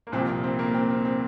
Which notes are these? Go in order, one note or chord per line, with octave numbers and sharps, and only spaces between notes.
A#3
C2 A#2 F3 C4
A#3
C4
A#3
C4
C4
C4